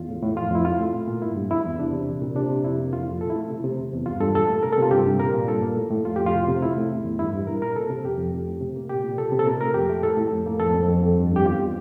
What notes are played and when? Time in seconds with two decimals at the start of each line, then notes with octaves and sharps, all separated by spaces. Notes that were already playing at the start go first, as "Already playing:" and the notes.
Already playing: E2 F4
0.09 A2
0.23 A2
0.37 F2 F4
0.51 F2 E4
0.65 A2 F4
0.79 A2
0.93 A#2
1.07 A#2
1.22 G2 E4
1.37 G2
1.51 E2 E4
1.64 E2
1.79 C3 D4
1.93 C3
2.08 A#2
2.22 A#2
2.36 C3 D4
2.50 C3
2.64 F2 E4
2.78 A#3
2.93 F2 F4
3.07 F2
3.21 A#2 A4
3.30 E4
3.36 A3
3.49 C3
3.64 C3
3.78 E2
3.93 E2
4.06 G2 F4
4.20 G2 A4
4.35 A#2 A4
4.49 A3
4.63 C3 A#4
4.73 A4
4.78 C3 F4
4.91 G2 G4
5.06 G2
5.20 A#2 A#4
5.34 A#2
5.48 G2 A4
5.62 A#3
5.77 A2
5.90 A2
6.05 F2 F4
6.16 F2 G4
6.26 F4
6.34 C3
6.48 C3
6.62 A2 E4
6.76 A2
6.91 E2
7.04 E2
7.19 G2 E4
7.34 G2
7.47 A#2 A#4
7.62 A#2 A#4
7.76 C3 A4
7.89 C3
8.04 F2 G4
8.18 F2
8.32 A2
8.47 A2
8.61 C3
8.76 A#3
8.89 A#2 G4
9.04 A#2
9.18 C3 A4
9.32 C3
9.39 A4
9.46 A#2 A#4
9.61 A3 A#4
9.74 F2 G4
9.90 A3
10.03 A2 A4
10.17 A2
10.32 F2
10.46 A#3
10.60 F2 A4
10.74 F2
10.89 F2
11.03 F2
11.17 G2
11.31 G2
11.36 G4
11.45 E2 F4